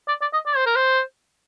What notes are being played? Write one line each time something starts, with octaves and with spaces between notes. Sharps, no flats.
D5
D5
D#5
D5
C5
A#4
C5